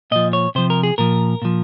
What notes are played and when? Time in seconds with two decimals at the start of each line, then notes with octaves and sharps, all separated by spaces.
0.11 A#2 F3 D#5
0.33 C#5
0.55 C3 F3 C5
0.70 A#4
0.83 G#4
0.98 A#2 F3 A#4
1.42 A#2 F3